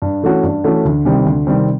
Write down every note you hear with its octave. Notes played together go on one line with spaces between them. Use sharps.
G2
E3 A3 C#4 F#4
G2
E3 A3 C#4 F#4
D2
C3 D#3 G3 C4
D2
C3 D#3 G3 C4